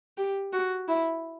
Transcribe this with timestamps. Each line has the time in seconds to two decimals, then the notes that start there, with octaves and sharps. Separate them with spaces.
0.17 G4
0.53 F#4
0.88 E4